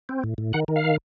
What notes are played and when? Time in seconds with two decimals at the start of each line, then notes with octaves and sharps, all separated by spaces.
0.09 C4
0.24 A2
0.38 A2
0.53 D#3 F#5
0.68 D#3
0.76 F5